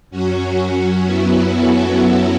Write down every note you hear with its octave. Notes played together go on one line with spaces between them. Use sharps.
F#2 F#3 C#4 F#4
C#4
B3 E4
E4 A4
C#4 F#4